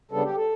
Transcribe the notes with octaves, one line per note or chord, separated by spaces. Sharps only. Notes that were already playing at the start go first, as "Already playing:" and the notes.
C#3 G3 B3 D4 A4
G4
A4